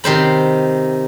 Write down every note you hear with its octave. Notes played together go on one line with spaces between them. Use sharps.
C3 D#3 C5 B5